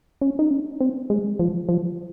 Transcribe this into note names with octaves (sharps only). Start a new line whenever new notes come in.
C#4
D#4
C#4
C4
G#3
F3
F3